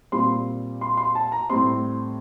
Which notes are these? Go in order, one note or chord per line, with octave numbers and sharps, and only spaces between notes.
A#2 G3 C4 C6
C6
C6
A5
A#5
A2 G3 C4 C6